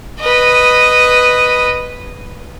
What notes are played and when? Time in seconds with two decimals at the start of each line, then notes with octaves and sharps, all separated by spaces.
0.20 B4 D#5